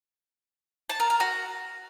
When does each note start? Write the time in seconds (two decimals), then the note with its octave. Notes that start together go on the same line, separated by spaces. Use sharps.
0.90 A5
1.00 A#4
1.10 A#4
1.20 F#4